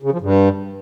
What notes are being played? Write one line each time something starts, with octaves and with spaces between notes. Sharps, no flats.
C#3
F3
G2